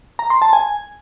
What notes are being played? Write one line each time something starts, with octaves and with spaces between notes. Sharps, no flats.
A#5
C6
A5
G#5